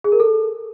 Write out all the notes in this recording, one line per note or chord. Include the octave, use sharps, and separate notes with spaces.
G#4
A#4
A4